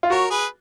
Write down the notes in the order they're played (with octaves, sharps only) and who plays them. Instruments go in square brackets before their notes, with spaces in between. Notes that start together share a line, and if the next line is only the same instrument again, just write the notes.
[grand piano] F4
[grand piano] F#4 [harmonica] A#4 C#5
[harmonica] G#4 B4